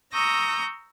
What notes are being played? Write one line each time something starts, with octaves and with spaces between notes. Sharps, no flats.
A#5 C#6 D#6 E6 G6 A#6